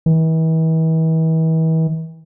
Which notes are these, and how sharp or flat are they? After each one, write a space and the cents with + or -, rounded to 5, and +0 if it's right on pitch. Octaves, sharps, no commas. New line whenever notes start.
E3 -40